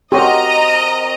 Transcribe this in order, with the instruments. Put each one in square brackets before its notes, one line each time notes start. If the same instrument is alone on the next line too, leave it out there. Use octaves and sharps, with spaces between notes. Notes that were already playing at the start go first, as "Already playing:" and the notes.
[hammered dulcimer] C4 F#4 A#4 [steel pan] G4 C#5 [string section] D#5 A#5